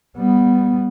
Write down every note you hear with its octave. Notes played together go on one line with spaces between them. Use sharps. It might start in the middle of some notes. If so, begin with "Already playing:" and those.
G3 B3